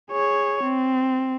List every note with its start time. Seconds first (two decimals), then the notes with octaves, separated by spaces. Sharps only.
0.12 G#4 C#5
0.63 C4